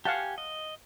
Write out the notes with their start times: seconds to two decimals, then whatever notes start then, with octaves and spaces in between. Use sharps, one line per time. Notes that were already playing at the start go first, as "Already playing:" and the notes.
0.05 G4 F5 F#5 G#5 A5
0.38 D#5